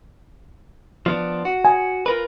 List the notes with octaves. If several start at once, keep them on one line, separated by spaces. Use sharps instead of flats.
F3 B3 D4
F#4
G#5
F4 A#4 B4